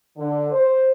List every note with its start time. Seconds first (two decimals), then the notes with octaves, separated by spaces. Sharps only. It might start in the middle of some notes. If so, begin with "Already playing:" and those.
0.17 D3
0.50 C5